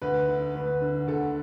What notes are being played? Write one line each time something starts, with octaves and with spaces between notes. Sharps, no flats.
D2 B4
D3
D2 B4
D3
D2 A4